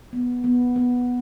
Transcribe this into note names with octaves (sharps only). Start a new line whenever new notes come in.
B3
B3
B3